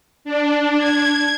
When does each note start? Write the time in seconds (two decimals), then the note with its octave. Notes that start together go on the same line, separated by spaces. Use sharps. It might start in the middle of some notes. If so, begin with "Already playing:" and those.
0.25 D4
0.78 G#6